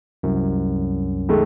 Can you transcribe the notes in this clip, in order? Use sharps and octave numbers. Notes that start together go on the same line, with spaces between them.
C2 F#2
D#3 G#3 A3